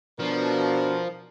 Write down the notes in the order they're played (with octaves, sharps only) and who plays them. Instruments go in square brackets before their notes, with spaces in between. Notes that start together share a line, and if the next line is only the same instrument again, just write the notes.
[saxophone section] B2 [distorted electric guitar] F3 [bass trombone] D4 [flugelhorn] A#4